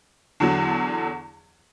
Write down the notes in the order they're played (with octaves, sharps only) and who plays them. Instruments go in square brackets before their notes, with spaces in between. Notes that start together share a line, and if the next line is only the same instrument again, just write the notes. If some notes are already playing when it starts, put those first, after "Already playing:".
[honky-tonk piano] E2 D3 F#3